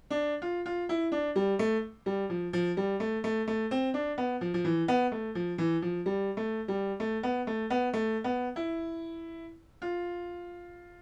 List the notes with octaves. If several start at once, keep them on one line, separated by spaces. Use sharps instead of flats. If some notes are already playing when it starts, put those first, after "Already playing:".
D4
F4
F4
E4
D4
G3
A3
G3
F3
F3
G3
A3
A3
A3
C4
D4
B3
F3
F3
E3
B3
A3
F3
E3
F3
G3
A3
G3
A3
B3
A3
B3
A3
B3
E4
F4